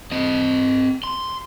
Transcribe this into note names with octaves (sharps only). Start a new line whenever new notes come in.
C4 D#5
C6